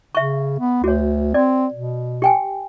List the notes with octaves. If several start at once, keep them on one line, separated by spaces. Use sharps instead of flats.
C#3 E5 C#6
B3
D2 F#4 C#5
C4 D5
B2
G4 G5 G#5